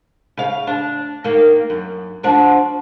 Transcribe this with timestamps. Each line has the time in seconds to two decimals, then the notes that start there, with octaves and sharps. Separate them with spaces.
0.37 C#3 F5
0.67 D4
1.24 D#3 A#3
1.70 F#2
2.23 F3 D4 F#4